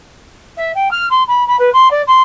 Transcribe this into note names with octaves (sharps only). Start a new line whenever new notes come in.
E5
G5
F6
C6
B5
B5
B4
C6
D5
C6